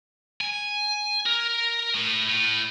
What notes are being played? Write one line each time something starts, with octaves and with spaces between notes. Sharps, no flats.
G#5
A#4
A2
A2